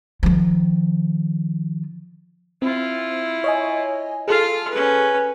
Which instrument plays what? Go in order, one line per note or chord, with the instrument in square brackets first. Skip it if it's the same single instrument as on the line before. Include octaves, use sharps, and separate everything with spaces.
[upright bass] D#3 F3
[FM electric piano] C4 [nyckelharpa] E4 F4
[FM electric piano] C#5 D#5 G#5
[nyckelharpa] F4 F5 [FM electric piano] G#4 A4
[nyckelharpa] C#4 B4